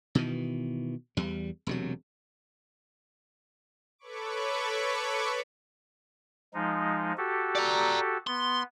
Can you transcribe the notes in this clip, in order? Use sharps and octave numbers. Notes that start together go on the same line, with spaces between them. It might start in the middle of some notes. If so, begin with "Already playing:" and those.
B2 D#3 E3
E2 G3
E1 C3 F#3
A4 B4 C#5 B5 C#6 D6
F3 G#3 D#4
F#4 G4 A4
D5 A#5
B3 C6